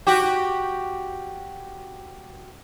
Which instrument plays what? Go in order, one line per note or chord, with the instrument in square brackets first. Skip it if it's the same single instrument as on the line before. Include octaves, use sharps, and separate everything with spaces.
[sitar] F#4 G4